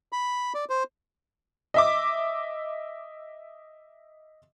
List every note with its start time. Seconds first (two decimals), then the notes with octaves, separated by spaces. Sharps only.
0.12 B5
0.54 D5
0.70 C5
1.74 D#5 E5 D6